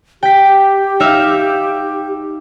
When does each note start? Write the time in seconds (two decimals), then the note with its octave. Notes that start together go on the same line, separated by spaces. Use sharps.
0.23 G4 G5 B6
1.00 D#4 E5 F5